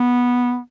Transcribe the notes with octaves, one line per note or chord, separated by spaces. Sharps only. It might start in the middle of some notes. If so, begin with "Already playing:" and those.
Already playing: B3